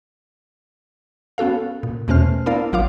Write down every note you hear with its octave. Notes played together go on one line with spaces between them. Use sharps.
B3 C#4 F#4 A4 F5
A#2
E2 B2 A3 C#4 C5 F6
B3 D4 E4 A#4 D5 F5
A1 F#3 F4 F5 D6